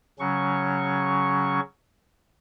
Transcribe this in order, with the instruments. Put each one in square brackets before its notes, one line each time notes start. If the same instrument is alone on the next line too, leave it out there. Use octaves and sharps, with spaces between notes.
[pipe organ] C#3 F#3 C#4 C#6